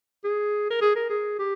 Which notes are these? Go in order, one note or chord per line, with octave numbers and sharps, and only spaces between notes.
G#4
A#4
G#4
A#4
G#4
G4